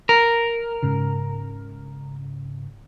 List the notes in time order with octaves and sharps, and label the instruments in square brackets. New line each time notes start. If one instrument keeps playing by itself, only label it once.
[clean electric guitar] A#4
[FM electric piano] G#2 C#3